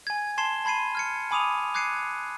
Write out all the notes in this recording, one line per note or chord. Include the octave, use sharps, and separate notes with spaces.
G#5 G#6
A5 C6 G#6 C7 E7 G7
A5 B5 G#6 C7 D#7
F6 G#6 C#7
G#5 B5 D6 D#6 D#7 F7
D6 F#6 G#6 C7 C#7 D#7